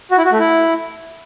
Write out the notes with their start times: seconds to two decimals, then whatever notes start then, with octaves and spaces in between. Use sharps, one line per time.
0.11 F#4
0.18 E4
0.25 F#4
0.32 A3
0.39 E4